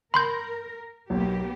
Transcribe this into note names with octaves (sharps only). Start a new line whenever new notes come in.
A#4 B5 C6 G6
B1 A#3 B3 G4